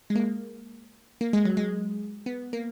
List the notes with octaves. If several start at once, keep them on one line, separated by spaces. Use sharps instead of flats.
G#3
A#3
A#3
G#3
F#3
G#3
B3
A#3